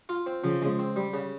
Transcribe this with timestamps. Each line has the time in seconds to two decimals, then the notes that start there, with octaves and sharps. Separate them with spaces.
0.09 F4
0.26 C4
0.43 C#3 F3
0.62 G#3
0.79 C4
0.96 G3
1.14 C#3